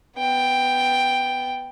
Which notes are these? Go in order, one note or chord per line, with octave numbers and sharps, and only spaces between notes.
B3 G5